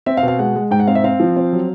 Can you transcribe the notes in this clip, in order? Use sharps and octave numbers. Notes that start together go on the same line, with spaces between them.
C4 E5
F5
B2
F5
G#3 F#5
G#3
G#2 G5
F#5
C4 F5
E5
C4 F5
F3
C4
F#3